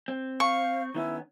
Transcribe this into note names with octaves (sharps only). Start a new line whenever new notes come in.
C4
F5 C#6
D#3 B3 C#4 E4